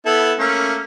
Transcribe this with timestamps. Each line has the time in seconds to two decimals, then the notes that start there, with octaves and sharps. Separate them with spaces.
0.06 B3 E4 A4
0.39 A3 A#3 C#4